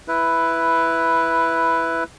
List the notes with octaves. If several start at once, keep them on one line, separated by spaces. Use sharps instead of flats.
E4 B4